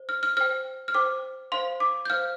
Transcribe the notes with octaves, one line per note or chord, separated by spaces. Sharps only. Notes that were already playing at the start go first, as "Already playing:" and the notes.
Already playing: C5
F6
F6
C5 G5 F6
F6
C5 G5 D6
C5 F5 C6
D6
G6
C5 F5 F6